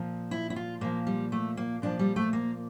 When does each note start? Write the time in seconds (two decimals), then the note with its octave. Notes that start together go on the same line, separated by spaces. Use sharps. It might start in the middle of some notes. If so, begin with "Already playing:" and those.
Already playing: A#2 F3
0.31 E4
0.50 E4
0.56 F4
0.81 A#2 F3 A#3
1.07 G3
1.32 A3
1.57 A#3
1.82 A#2 F3 D4
1.99 G3
2.16 A3
2.33 A#3